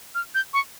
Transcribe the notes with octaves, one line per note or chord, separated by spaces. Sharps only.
F6
G6
C#6